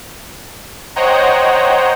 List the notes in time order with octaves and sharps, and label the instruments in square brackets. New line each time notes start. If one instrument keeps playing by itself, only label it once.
[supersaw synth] C5 C#5 D#5 F#5 G5 A#5